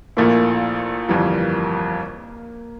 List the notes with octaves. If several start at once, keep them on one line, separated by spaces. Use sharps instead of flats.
A#1 A#2 A3 A#3 E4
G1 F2 E3 G3